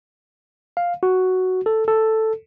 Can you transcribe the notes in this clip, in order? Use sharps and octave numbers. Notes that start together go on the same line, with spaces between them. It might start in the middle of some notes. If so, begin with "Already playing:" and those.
F5
F#4
A4
A4